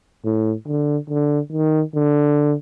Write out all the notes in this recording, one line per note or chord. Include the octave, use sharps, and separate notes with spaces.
A2
D3
D3
D#3
D3